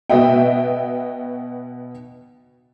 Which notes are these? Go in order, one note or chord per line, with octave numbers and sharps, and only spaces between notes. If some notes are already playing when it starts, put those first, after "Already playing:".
B2 B3 F#4 D#5 E5 G5